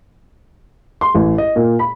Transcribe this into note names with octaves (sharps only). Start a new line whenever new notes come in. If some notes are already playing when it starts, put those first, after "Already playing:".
C6
A1
D#5
A#2
B5